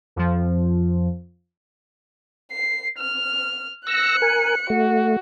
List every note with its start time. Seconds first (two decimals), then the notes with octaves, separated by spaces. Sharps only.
0.16 F2 F3
2.51 C7
2.99 F6
3.87 E6 F#6 A#6 C#7
4.22 A#4 G#5
4.70 A3 F#4